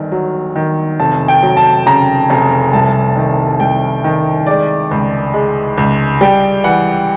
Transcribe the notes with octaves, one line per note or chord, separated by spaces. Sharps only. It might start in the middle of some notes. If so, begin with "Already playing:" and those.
Already playing: G1 D#3
F#3
D#3
F1 A5
G5
F#3
A5
C#3 A#5
F1
C2 A5
D#3
C2 G5
D#3
G#3 D5
C#2
G#3
C#2
G3 G5
E3 F#5